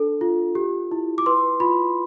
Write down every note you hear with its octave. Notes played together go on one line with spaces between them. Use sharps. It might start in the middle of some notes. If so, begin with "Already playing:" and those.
Already playing: D4 A4
F4
G4
E4
D6
B4 C6
F4 B5